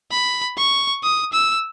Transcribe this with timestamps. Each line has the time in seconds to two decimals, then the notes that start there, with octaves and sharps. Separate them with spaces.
0.11 B5
0.57 C#6
1.03 D#6
1.33 E6